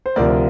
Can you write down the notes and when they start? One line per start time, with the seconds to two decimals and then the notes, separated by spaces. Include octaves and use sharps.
0.06 C5
0.16 D2 C3 F3 A#4 D5